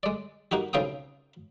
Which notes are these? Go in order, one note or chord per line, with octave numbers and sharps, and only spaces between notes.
G#3 D5
A#3 D#4 F#4 G4
B1 C#3 C4 F5 G5 D#6